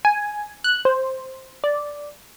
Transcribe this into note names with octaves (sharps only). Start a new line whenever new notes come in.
G#5
F#6
C5
D5